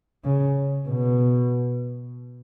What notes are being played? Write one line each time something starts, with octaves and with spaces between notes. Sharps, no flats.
C#3
B2